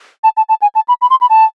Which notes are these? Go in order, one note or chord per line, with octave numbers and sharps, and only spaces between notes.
A5
A5
A5
G#5
A5
B5
B5
C6
B5
A5